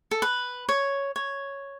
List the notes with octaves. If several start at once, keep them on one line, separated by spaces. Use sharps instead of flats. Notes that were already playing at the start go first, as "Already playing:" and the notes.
A4
B4
C#5
C#5